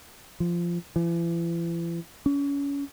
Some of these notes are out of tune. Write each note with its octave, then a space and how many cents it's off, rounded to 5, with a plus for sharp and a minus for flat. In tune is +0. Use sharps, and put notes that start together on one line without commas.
F3 -15
E3 +40
C#4 +30